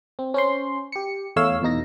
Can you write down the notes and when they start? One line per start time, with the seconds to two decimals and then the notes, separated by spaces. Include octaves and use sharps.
0.19 C4
0.34 C#4 C5 C6
0.92 G4 C#7
1.36 E2 A3 C#5 F5 E6
1.62 E2 B2 D#4 A#6